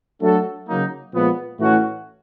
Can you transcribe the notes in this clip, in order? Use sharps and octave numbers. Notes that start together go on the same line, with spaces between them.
F#3 A3 D4 F#4 A4
C#3 F#3 A#3 D#4
A#2 F3 G#3 B3
A2 E3 A3 C#4 F#4